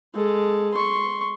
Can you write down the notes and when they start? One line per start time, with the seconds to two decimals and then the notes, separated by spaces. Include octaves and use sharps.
0.15 G#3 A4
0.74 C6 C#6